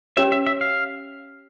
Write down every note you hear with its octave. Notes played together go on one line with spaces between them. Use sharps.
C#4 G4 C#5 E5
E5
E5
F5